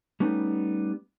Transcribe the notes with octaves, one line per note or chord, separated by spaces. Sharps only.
G3 A3 B3 C#4 D#4